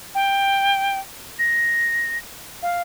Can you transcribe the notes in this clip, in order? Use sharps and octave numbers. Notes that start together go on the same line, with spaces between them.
G5
A#6
F5